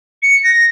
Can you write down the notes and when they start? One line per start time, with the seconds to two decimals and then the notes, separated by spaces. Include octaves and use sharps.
0.22 C#7
0.44 A#6